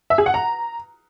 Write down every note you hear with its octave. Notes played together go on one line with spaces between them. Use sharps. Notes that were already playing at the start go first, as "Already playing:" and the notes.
E5
G#4
F#5
A#5